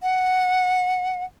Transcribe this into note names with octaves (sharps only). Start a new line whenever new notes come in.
F#5